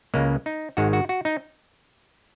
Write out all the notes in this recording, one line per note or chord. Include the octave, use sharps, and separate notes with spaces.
C#2 C#3 G#3 A#3
D#4
G#1 G#2 D#3 G#3 F#4
F#4
F#4
D#4